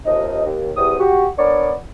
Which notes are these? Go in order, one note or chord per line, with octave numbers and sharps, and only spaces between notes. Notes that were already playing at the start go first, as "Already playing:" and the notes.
D#2 C3 F3 D#4 D#5
D#2
E2 C3 D#6
F#4 G4
B3 D4 A#4 C#5 D5